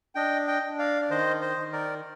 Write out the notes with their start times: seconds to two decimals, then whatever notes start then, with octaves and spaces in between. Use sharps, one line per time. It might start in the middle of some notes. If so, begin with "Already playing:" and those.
0.15 D4 D#5 G5
0.47 D#5 G5
0.62 D4
0.79 D5 F5
1.02 D5
1.10 D#3 C5 D#5
1.41 C5 D#5
1.57 D#3
1.72 A#4 D5